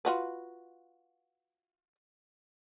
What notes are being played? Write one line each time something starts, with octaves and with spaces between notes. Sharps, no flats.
F4 F#4 B4